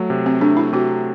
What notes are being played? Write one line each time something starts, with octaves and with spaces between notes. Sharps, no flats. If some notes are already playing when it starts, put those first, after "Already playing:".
Already playing: F#3 A3
C3
C4
A3 D4
E4
C3 F#4